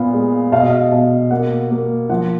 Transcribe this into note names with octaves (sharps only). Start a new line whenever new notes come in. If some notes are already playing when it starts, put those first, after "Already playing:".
Already playing: A#2 B3 F5
G#3
B2 F5
D#5
F5
B2
A#3 F#5
A#3
F3 F#5